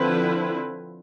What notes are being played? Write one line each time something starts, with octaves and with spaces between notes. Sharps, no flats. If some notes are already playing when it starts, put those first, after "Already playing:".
Already playing: D3 F3 C4 E4 B4